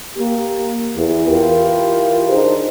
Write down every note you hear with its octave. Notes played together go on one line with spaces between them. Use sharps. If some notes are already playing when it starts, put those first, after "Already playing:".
A#3 G4
E2
E3 F4 G4 A#4
D4 D#4 G#4 C5